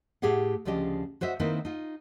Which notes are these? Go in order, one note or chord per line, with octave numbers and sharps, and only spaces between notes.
A2 G4 G#4 E5 F#5
D2 C#3 F3 D4 G4 D#5
F#4 C5 D#5 E5
D#3 A#3 C4 D#4 E4 B4
D#4 F4